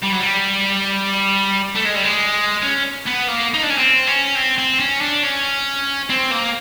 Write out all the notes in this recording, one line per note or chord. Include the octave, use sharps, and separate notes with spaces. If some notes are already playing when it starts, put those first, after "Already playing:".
G3
F#3
G3
A3
G#3
G3
G#3
C#4
B3
A#3
D#4
D4
C#4
C4
C#4
C4
C4
C#4
D4
C#4
C4
A#3